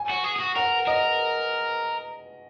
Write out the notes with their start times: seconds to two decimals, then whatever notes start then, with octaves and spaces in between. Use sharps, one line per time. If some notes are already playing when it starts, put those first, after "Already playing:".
Already playing: G#5
0.09 F#4
0.24 G#4
0.36 G#4
0.40 F#4
0.56 A#4 F#5
0.87 A#4 D#5